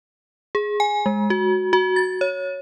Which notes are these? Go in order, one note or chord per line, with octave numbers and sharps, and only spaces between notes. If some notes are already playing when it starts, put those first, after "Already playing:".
G#4
G#5
G#3
F#4
F#4
A6
C#5